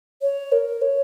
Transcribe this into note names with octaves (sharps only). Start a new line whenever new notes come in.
C#5
A#4
C#5